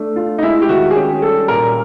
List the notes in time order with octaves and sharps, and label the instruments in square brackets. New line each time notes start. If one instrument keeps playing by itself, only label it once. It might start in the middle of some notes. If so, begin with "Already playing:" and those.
Already playing: [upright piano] A3 D4
F4
[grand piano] D#4
[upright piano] G#3 [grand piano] E4
[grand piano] G4
[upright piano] D#3 [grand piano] F#4
[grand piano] G#4
[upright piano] C#4 [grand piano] G4
[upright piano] G3 [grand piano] A4
[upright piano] A#2 [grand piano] A#4